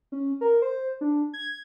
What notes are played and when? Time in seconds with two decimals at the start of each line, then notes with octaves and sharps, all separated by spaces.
0.12 C#4
0.41 A#4
0.62 C5
1.01 D4
1.34 G#6